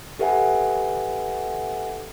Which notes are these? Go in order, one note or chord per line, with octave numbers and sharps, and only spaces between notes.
G4 A4 B4 E5 F#5 G#5